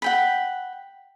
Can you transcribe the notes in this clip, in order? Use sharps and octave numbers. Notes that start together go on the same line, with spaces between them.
F#5 G5 B5